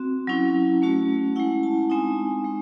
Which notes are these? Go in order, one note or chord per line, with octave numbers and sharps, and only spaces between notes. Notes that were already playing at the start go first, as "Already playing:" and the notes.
Already playing: C4 F#4
F#3 C#4 E4
A3 C#4 F#4
G#3 C#4 E4 F#5
A5
G#3 C4 D#4 G#5
G#3 D#4